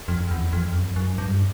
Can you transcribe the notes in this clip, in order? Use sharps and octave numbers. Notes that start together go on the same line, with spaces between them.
F2
E2
F2
F#2
F#2
G2